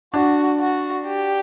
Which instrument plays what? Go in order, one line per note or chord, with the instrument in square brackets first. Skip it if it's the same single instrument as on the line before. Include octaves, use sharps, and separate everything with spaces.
[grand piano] D4 [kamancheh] F#4
[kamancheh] F#4
G4